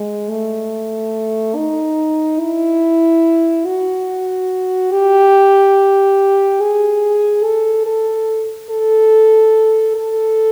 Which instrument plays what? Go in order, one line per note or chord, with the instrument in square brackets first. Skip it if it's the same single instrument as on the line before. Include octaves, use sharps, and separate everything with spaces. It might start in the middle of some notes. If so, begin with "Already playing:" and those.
Already playing: [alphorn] G#3
A3
D#4
E4
F#4
G4
G#4
A4
A4
A4
A4